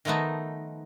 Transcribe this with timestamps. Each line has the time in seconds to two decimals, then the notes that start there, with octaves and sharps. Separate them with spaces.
0.05 D#3 F3 A3 B3 D#4